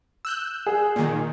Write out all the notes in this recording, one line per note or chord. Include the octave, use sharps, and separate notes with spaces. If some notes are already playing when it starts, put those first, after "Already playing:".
E6 F#6 G6
G#4
A#2 D#3